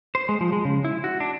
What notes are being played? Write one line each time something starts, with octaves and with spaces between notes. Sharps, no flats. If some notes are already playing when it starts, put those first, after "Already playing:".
C5
G#3
F3
G#3
C#3
E4
F#4
D4